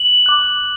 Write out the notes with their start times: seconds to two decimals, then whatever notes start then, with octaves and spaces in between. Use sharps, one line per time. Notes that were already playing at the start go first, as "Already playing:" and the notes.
Already playing: F#7
0.26 D6 F#6